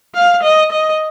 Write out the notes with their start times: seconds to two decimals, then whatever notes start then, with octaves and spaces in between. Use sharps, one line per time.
0.14 F5
0.43 D#5
0.72 D#5